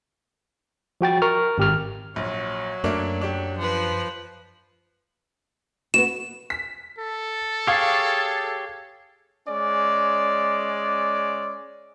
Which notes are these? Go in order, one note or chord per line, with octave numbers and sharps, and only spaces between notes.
F3 F#4 G5 A6
A#4 C#6 F6
G#1 G4 F6
A#1 F#3
F#2 A3 A#3 D4
D4 G4
F3 B4
B3 C4 F#4 E7
B6
A4
G4 G#4 C#5 F5
G#3 C#4 D5